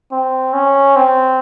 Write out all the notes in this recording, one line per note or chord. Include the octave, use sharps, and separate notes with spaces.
C4
C#4
C4